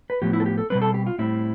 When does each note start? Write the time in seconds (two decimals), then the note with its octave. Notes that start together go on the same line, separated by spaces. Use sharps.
0.10 B4
0.22 A2 F3 B3 G4
0.33 E4
0.40 A4
0.46 G4
0.58 A4
0.70 B2 G3 C4 B4
0.82 A4
0.94 G4
1.06 F4
1.19 A2 G3 C4 E4